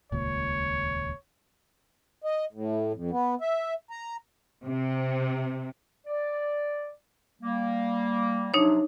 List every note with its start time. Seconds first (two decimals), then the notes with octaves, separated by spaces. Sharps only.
0.12 D#1 C#2 A#2 C#5
2.24 D#5
2.53 A2
2.94 F2
3.11 B3
3.41 E5
3.91 A#5
4.65 C3
6.06 D5
7.42 G3 A#3
8.54 C3 F3 F#3 D4 D#4 C#5